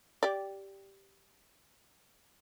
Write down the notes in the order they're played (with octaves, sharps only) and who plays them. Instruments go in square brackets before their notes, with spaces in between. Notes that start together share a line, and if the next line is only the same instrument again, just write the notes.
[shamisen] G4 D5